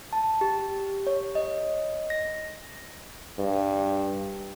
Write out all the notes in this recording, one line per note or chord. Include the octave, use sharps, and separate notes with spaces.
A5
G4
C#5
D#5
A#6
G2